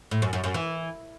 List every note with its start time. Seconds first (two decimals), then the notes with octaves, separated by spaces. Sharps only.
0.11 A2
0.22 F#2
0.33 F#2
0.44 F#2
0.54 E3